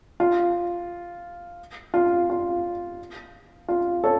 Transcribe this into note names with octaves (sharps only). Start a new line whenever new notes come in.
F4
F4
F4
F4
A4 C#5